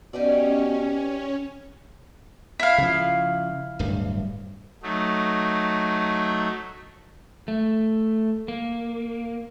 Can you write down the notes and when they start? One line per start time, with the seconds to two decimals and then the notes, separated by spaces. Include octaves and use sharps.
0.13 B2 C#4 D#4 G4 D5
2.60 E4 F5
2.78 C#3 F3
3.79 D1 G2
4.83 F#3 A3 D#4
7.48 A3
8.48 A#3